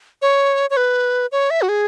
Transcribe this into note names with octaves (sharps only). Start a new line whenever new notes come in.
C#5
C#5
B4
C#5
E5
F#4
G#4